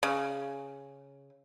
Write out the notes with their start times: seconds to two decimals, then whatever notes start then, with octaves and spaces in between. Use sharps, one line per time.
0.03 C#3